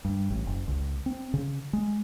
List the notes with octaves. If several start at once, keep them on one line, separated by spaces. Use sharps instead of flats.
G2
A1
F#1
C#2
C4
C#3
G#3